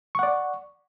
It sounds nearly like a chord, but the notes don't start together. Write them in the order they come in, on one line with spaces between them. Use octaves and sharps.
C#6 F#5 D5